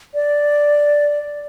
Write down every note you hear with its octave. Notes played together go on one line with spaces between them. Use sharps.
D5